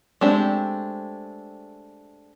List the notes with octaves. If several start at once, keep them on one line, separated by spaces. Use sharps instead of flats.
G#3 A3 C4 D4 G4